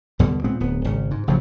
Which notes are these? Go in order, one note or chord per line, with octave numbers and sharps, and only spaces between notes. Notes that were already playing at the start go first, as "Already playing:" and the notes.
D#2 B2 D3 G3
A#2 G#3 B3 C4
D1 B3
G#1 C#3
G#2
A1 C#3 F3 F#3